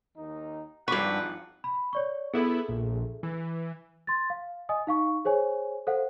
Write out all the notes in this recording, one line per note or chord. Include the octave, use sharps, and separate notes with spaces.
D#2 D#3 D#4
G#1 G2 F3 B4 F#5 C#6 D6
B5
C#5 D5 C#6
B3 E4 G#4 A4 E5
A#1
E3
C6 A6
F5
D#5 G#5 D#6
D#4 F5 C#6
G#4 C5 C#5 G#5
A4 C5 F5 F#5